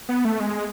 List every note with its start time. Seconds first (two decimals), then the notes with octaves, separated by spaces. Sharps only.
0.09 B3
0.25 A3
0.40 G#3